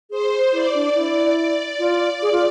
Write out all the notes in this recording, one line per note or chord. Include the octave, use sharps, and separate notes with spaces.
G#4 C5
E4 D5
D4
E4
D5
F4
G#4
F4